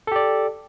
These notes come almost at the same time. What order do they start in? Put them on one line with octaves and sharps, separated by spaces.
A4 G4 D5